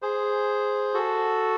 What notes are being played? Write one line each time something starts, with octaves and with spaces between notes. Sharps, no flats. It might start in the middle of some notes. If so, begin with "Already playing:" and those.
G#4 C5
F#4 A4